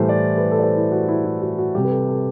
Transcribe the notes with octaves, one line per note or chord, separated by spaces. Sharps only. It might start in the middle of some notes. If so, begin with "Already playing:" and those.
Already playing: A2 E3 G3 A4 C5
D5
B4
A4
D5
C5
E4
F#4
E4
E4
F#4
F#4
C3 G3 G4
B4
A4
A4